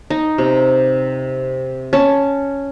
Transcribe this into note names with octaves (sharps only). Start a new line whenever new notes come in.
D#4
C3
C#4 A5